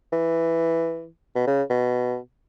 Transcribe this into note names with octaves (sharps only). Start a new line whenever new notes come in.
E3
B2
C#3
B2